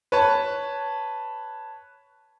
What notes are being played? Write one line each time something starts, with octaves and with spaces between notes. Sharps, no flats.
B4 C#5 A5